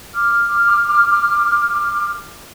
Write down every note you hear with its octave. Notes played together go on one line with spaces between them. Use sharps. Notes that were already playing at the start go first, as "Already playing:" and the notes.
D6 F6